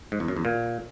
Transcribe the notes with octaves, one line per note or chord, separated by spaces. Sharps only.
G#2
E2
F#2
E2
A#2